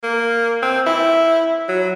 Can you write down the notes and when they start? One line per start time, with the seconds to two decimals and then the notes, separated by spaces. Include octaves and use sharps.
0.03 A#3
0.62 C4
0.86 E4
1.68 F#3